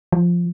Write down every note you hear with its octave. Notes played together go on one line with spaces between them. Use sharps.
F3